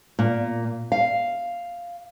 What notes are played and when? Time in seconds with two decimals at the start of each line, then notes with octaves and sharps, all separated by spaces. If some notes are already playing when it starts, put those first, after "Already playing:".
0.19 A#2
0.92 F5